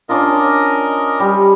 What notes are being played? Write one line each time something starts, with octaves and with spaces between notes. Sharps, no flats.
C#4 D4 F4 A#4 D#5
G3